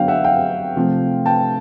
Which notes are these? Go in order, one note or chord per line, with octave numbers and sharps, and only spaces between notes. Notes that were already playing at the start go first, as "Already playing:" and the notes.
Already playing: D3 F#3 B3 F5 G5
E5 F#5
F5 G5
C3 F3 A3
G5 A5